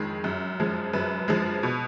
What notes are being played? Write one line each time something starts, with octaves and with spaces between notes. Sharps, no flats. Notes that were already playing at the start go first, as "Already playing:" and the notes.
Already playing: F2 D#3 G#3
F#2
F3 G#3
F#2 B4
F3 G#3
B2